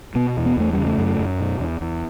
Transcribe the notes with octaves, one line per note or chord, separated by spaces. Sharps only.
B2 B3
E2
B3
E2 A3
C#3 G3
A3
F#2
F#2
B2
E2
E2